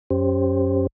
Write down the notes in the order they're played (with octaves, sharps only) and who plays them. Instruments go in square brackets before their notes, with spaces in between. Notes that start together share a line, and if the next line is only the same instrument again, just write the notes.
[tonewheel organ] F#2 C#4 G4 C5